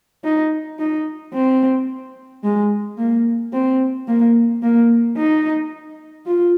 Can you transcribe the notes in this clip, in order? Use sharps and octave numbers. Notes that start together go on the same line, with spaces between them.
D#4
D#4
C4
G#3
A#3
C4
A#3
A#3
D#4
F4